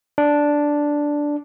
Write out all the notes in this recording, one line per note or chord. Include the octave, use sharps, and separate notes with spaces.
D4